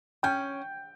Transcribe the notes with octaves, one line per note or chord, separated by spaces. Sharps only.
C#4 G5 G6